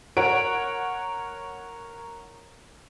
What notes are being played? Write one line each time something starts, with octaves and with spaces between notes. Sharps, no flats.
A#4 C#5 F#5 D7